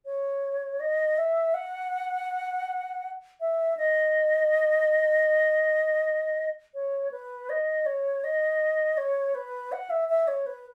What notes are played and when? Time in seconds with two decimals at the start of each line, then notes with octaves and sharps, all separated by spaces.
0.06 C#5
0.80 D#5
1.18 E5
1.54 F#5
3.40 E5
3.77 D#5
6.75 C#5
7.11 B4
7.50 D#5
7.86 C#5
8.24 D#5
8.97 C#5
9.35 B4
9.72 F#5
9.90 E5
10.09 E5
10.28 C#5
10.46 B4